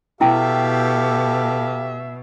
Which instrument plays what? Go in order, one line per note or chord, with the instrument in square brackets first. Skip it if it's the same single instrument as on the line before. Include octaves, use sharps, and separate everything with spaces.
[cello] B2 [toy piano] E4 G5 [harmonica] G4 A4 F5 [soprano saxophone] E5